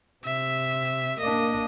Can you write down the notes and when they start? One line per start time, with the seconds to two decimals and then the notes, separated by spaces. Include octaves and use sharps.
0.25 C3 E5
1.19 A#3 D4 D#5